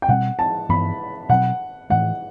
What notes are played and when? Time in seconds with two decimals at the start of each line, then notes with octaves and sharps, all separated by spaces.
0.02 G5
0.08 B2 G3 C4 F#5
0.39 A5
0.69 G2 E3 B3 B5
1.29 B2 F#3 C4 F#5
1.90 A2 E3 A3 F#5